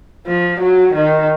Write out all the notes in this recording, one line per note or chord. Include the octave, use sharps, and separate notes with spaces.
F3
F#3
D#3